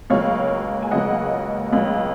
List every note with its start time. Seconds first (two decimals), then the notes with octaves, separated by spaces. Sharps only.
0.10 C#2 C#3 F#3 A#3 C#5 F5
0.82 G#5
0.91 C#2 C#3 F#3 A#3 D#5 F#5
1.73 C#2 C#3 F#3